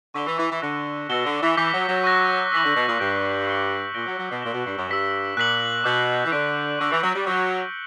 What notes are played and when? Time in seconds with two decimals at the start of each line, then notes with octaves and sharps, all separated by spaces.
0.14 D3 C#6 E6 B6 E7 G7
0.27 E3
0.38 E3
0.50 E3
0.61 D3 F#6 A#6 C#7
1.10 B2 E6 A#6 C#7 E7 G7
1.25 D3
1.42 E3
1.57 E3 D6 G6 B6
1.73 F#3
1.88 F#3
2.04 C#6 F#6 A#6
2.52 E3 E6 B6 F#7
2.64 D3
2.75 B2
2.87 A#2
2.99 G2 C#6 G6 A#6 D7
3.47 C#6 G6 C#7 G7
3.94 A#2 G6 A#6 D7 G7
4.06 F#3
4.18 F#3
4.30 B2
4.42 A#2 A#6 E7 G7
4.53 B2
4.65 G2
4.77 F#2
4.89 G2 E6 B6 E7
5.37 A#2 F#6 B6 F#7
5.84 B2 D6 G6 B6 F#7
6.25 E3
6.31 D3 C#6 E6 B6 D7
6.79 D3 C#6 E6 A#6
6.91 E3
7.02 F#3
7.14 G3
7.27 F#3 D6 G6 C#7 G7